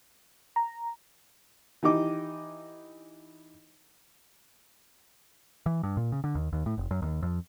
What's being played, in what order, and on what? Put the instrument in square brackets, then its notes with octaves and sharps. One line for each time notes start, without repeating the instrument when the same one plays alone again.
[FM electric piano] A#5
[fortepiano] E3 D#4 G4 D#5 D6
[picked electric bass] E3
G2
A#2
C#3
D3
D#2
D#2
A2
F1
F#2
D#2
F2